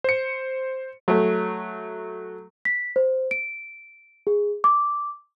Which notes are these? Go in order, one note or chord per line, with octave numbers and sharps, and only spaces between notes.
C5 C#7
F#3 A3
B6
C5
D7
G#4
D6